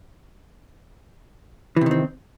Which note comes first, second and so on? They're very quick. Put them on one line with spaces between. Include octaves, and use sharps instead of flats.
E3 C3 D#3 C4